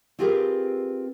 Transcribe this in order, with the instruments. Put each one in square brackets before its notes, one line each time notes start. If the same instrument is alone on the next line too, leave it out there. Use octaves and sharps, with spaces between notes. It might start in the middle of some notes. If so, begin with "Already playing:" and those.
[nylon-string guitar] C4 F4 G4 G#4 A#4 B4